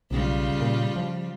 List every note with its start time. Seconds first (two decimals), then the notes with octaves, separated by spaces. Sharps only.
0.11 B1 C#3 G3 F4
0.60 A#2
0.96 F3